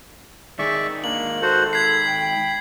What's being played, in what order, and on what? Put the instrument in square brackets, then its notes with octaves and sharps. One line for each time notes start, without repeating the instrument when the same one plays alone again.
[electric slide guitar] D#3 G#3 D#4 [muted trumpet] G#4 [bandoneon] D5 E5 C#6
[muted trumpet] A#3 [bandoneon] D4 [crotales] F#7
[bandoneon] F#4 C5 F#5 [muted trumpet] A4
[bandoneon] B5 [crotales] G#6 C7
[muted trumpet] G5